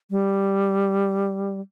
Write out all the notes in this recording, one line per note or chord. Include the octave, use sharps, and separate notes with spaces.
G3